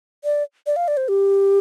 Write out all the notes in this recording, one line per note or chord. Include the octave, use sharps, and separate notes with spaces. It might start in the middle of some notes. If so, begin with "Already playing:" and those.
D5
D5
F5
D5
C5
G4